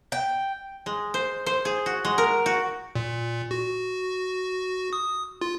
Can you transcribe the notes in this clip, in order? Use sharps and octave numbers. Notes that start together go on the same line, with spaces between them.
G5
G#3
C5
C5
G#4
F#4
G#3
A#4
F#4
A#2
F#4
D#6
F4